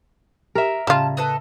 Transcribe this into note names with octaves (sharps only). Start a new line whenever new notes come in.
G4 A#4 E5
A2 C#3 G3 F4 A5
A4 B4 D#5